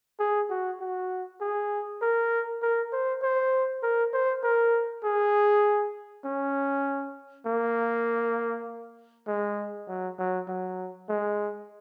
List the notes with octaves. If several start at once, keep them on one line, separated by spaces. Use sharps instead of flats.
G#4
F#4
F#4
G#4
A#4
A#4
C5
C5
A#4
C5
A#4
G#4
C#4
A#3
G#3
F#3
F#3
F#3
G#3